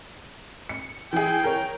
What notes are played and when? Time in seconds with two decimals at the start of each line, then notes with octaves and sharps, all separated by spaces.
0.69 C#7
1.13 E3 G#4 G5
1.44 A#4 C#5